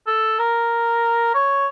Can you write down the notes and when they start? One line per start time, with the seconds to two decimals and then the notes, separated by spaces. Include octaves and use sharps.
0.07 A4
0.39 A#4
1.34 C#5